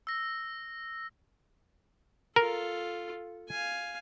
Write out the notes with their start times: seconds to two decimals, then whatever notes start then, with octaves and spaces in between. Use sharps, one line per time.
0.07 E6 A#6
2.36 F4 A4 A#4
3.49 F5 G#5